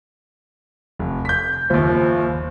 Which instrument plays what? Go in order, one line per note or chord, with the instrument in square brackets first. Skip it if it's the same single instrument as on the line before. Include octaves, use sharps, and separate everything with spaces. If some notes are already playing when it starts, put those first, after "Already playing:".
[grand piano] F1
G6 B6
[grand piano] F#1 D#2 [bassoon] F3